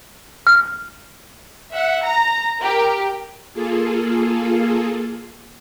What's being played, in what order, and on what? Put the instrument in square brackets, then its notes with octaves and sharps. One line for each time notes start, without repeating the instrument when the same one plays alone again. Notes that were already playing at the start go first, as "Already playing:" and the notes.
[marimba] F6
[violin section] E5 F#5
A#5 A#6
G4 A#4
[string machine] A#3 F4 G#4 A4